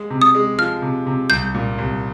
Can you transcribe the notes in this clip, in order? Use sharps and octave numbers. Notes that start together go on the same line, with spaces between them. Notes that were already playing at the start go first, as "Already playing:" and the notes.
Already playing: G#3
C3
D#6
G#3
F3 F6
C3
C3
C2 G6
A#2
C2